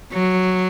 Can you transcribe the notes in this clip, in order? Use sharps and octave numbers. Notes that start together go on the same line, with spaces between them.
F#3